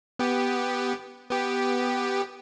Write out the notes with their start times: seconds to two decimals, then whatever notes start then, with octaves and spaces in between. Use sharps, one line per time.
0.19 B3 G4
1.30 B3 G4